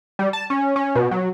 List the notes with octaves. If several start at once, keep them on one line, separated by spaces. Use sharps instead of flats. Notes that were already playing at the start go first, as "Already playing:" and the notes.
G3
A5
C#4
C#4
B2
F#3